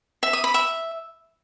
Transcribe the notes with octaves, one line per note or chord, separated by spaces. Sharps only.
E5
D#6
B5
E5